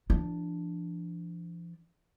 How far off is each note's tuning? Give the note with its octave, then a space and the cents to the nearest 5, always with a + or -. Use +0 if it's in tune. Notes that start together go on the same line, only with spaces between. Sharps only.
F3 -45 D4 +0